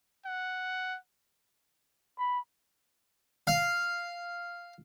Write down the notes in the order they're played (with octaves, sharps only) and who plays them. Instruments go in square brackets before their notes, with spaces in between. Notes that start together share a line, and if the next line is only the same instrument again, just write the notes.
[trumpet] F#5
[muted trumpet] B5
[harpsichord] F5